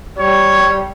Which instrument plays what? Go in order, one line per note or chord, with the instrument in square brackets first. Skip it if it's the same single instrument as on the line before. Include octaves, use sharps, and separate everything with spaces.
[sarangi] G3 [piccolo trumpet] C#5